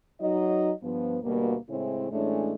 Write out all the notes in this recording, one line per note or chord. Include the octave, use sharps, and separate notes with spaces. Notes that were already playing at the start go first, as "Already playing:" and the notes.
F#3 D#4 D#5
G2 F3 B3
D2 B2 G3 A#3
A2 C#3 G#3 C4 C#4 E4
A2 E3 G#3 A3 C#4 D4